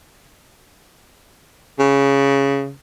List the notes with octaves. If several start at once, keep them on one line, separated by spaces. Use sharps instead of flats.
C#3